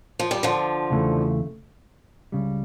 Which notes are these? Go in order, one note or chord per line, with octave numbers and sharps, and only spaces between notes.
F3
G3
D3 F3
E2 C#3 E3 A3
C#2 C#3 G3